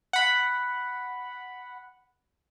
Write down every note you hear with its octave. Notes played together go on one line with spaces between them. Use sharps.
F#5 B5